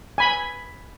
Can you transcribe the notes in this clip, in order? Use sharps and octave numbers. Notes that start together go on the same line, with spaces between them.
G#5 B5